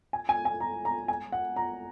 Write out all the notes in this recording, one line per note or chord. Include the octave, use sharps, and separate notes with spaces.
G#5
G#5
G#5
A#5
A#5
G#5
F#5
A#5